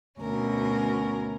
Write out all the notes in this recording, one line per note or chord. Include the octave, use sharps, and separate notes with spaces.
D2 B2 C#4 A#4